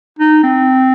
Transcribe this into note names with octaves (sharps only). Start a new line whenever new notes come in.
D#4
C4